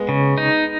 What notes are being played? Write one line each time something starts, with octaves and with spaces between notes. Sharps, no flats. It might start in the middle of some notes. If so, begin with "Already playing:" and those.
Already playing: G#3 B3
C#3
D#4